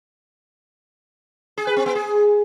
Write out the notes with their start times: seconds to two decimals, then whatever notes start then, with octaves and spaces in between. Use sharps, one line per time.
1.57 G#4
1.67 B4
1.76 C4
1.86 B3
1.95 G#4